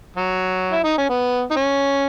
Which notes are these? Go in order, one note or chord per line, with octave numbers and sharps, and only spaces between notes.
F#3
E4
D#4
C#4
B3
D#4
C#4